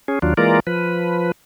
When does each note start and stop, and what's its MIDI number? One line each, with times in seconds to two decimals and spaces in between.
0.08 0.19 61
0.08 0.19 68
0.22 0.34 39
0.22 0.34 54
0.22 0.34 62
0.22 0.34 65
0.37 0.60 52
0.37 0.60 56
0.37 0.60 58
0.37 0.60 65
0.37 0.60 70
0.37 0.60 74
0.67 1.32 53
0.67 1.32 71